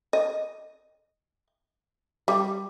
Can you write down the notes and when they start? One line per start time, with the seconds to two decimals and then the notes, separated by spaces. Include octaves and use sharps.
0.13 D#5
2.28 G3